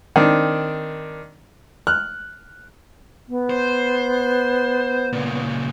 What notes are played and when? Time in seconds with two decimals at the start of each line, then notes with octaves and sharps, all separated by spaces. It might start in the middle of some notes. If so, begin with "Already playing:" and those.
0.16 D#3 C4 D4
1.87 F6 F#6
3.28 B3
3.50 C5
5.13 A#2 C#3